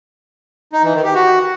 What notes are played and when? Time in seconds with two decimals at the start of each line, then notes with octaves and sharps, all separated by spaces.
0.73 D#4
0.83 E3
0.94 D#3
1.04 G4
1.15 F#4